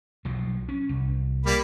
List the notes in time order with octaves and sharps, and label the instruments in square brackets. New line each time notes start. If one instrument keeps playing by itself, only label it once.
[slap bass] B1 F3 F#3
C#4
C2
[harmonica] G3 A#3 B5